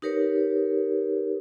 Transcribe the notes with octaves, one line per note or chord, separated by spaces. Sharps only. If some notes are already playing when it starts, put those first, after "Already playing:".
D#4 G4 A#4 B4 C#5